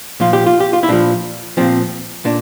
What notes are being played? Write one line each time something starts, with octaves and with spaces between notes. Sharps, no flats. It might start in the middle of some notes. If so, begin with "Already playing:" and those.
A#2 F3 F4
G4
F4
G4
F4
E4
A#2 F3 D4
A#2 F3 C4
A#2 D4